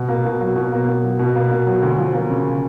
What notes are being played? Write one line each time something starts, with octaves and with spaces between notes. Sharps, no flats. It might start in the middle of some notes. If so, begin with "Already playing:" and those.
Already playing: B2
A#3
B2
F#3
B2
A#3
B2
F#3
B2
A#3
B2
F#3
D2
F3
A#3
C#3